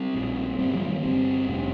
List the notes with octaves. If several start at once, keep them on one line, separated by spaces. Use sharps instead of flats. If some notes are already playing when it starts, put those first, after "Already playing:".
Already playing: G3 C4
A#1 A#2
G1 G2 G3 C4
F3 A#3
D#3 G3
G1 G2 G3 C4
F1 F2 C3